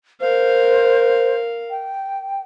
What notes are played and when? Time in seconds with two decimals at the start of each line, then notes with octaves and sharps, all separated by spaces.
0.21 A#4 C5 F5
1.70 G5